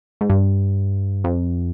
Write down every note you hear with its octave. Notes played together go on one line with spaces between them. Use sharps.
G#2
G2
F2